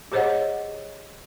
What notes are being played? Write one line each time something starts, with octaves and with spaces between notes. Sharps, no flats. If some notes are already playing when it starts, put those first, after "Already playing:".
G4 G#4 C5 C#5 D#5 F#5